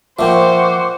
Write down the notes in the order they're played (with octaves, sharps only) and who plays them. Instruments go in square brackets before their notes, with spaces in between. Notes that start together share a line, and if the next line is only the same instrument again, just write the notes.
[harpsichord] A#2 F3 [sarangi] C5 [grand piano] E5 G5 [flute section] F#5 C#6 D6